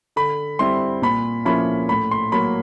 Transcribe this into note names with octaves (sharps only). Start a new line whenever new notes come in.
D3 B5
G3 C4 E4 C6
A#2 B5
F3 A#3 C#4 E4 B5
A2 B5
C6
F#3 A#3 B5